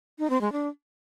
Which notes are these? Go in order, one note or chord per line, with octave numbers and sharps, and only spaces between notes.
D#4
C4
G#3
D4